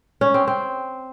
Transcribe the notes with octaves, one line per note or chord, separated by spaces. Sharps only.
C#4
C4
C4